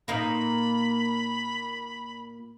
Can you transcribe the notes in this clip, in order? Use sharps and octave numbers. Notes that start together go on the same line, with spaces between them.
A#2 A#3 D#4 B5